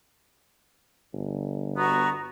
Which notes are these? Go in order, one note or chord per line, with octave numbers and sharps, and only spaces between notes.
G1
B3 F#4 A#5 C#6